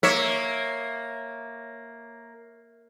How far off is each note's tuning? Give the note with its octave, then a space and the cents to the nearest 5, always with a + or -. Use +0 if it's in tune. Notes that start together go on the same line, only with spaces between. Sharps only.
A#3 +0 C#5 -5 E5 -10